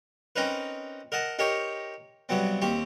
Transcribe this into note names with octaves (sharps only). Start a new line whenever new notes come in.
C4 C#4 D#4 A#4 B4
A#4 D#5 F#5 A5
D#4 G4 A#4 C5 C#5 C#6
G2 C3 F#3 B3 C4
D#2 C4 G4 C#6